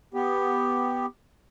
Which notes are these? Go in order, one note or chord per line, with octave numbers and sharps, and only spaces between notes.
B3 G4